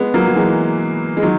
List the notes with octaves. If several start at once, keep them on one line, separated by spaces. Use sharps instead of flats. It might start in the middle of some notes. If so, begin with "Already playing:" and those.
Already playing: G#3 B3
F#3 A#3
F#3
E3 G#3
G#3
D#3 F#3